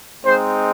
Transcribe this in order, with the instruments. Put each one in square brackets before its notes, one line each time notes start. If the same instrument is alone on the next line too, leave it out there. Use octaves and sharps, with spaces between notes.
[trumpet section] G#3 C4 D#4 C5